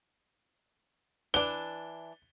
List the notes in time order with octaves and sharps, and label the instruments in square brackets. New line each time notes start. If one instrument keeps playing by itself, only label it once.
[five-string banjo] E3 D4 [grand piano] G7